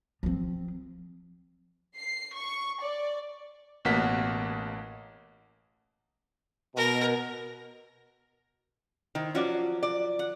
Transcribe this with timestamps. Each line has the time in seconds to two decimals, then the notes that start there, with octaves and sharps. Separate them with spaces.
0.23 F3 C4
1.95 C7
2.35 C#6
2.80 D5
3.85 A1 B2 A#3 F#5 B6
6.76 B2 A#4
9.15 D#3 E4 C5
9.35 F3 F#3 C#4 F#4 D5 C#6
9.83 D5
10.19 F#5